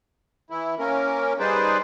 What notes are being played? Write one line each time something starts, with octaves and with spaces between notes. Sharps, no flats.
E3 E4
A#3 C#4 A#4
G3 D#4 G#4 B4 C5 D5